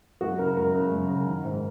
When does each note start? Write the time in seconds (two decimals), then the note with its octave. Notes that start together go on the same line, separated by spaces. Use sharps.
0.21 F#2 F#4
0.39 C#3 A#4
0.57 F#2 A#4
0.74 C#3
0.91 F#2
1.08 C#3
1.26 D#3
1.44 G#2